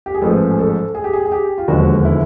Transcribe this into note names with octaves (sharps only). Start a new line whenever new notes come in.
G4
G#4
A1 G#2 F3 G#3 A4
G#4
A4
G#4
G4
G#4
G#4
G4
F4
E1 D#2 D3 F3 G#3 F#4
E4